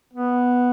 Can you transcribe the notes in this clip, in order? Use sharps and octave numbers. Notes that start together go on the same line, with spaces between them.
B3